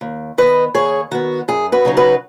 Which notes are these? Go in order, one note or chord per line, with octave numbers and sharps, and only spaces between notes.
D#2
D#3 B3 B4 D#5
D#2 G#4 C#5
D#3 B3 F#4
F#2 G#4
F#4 B4
C#3 F#3 D#4
F#4 B4